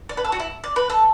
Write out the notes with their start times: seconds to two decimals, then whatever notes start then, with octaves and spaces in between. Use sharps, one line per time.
0.09 D5
0.17 B4
0.25 A4
0.32 F#4
0.40 E4
0.64 D5
0.76 B4
0.90 A4